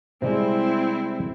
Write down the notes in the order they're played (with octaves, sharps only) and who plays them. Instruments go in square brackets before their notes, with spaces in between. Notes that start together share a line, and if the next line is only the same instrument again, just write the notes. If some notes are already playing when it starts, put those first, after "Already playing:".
[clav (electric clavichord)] C3 G3 G#3 [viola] C4 E4